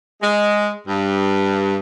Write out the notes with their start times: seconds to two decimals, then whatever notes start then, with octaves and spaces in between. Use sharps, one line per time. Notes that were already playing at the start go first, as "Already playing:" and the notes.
0.22 G#3
0.87 G2